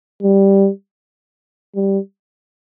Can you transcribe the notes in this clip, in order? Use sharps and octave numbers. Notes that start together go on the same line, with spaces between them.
G3
G3